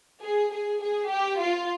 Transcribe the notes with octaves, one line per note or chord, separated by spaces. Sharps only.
G#4
G#4
G#4
G4
F4